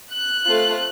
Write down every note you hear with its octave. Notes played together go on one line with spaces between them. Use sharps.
F#6
A3 C4 F4 A4